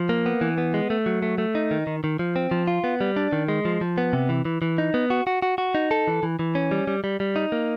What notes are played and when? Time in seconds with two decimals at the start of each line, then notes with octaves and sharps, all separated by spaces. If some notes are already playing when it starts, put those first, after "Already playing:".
Already playing: F3
0.09 A#3
0.26 B3
0.41 E3
0.58 B3
0.74 G#3
0.90 A3
1.06 F#3
1.22 A3
1.38 A3
1.55 D#4
1.71 D#3
1.87 D#3
2.04 D#3
2.19 F3
2.36 C4
2.51 F3
2.67 F4
2.84 B3
3.01 G3
3.16 D4
3.33 D#3
3.48 G#3
3.65 F3
3.81 F3
3.98 B3
4.13 C3
4.29 E3
4.45 E3
4.62 E3
4.78 D#4
4.94 B3
5.10 F#4
5.27 F#4
5.42 F#4
5.58 F#4
5.75 D#4
5.91 A4
6.08 E3
6.23 E3
6.39 E3
6.55 C#4
6.71 G3
6.88 G3
7.04 G3
7.20 G3
7.36 D#4
7.52 A#3